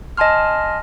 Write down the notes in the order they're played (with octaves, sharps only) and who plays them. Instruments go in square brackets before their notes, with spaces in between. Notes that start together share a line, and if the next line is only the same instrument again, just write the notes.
[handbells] D#5 G#5 A5 C6 F6